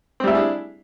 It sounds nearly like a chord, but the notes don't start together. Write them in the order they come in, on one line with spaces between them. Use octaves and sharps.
C4 G3 E4 G#4 D4